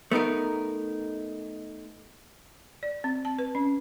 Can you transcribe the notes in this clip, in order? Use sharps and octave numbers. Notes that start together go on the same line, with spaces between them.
A3 B3 D#4 A#4
D5
C4
A5
B4
C#4